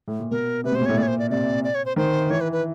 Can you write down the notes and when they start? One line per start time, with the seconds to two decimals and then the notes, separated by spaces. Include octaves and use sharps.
0.08 A2
0.20 A#2
0.31 B2 A#4
0.64 C3 B4
0.72 B2
0.75 C5
0.81 A#2
0.86 A2 C#5
0.97 A#2 D5
1.03 C#5
1.08 C5
1.19 D5
1.31 C3 D5
1.64 D5
1.75 C#5
1.85 C5
1.96 D#3 C5
2.30 E3 C#5
2.41 B4
2.52 B4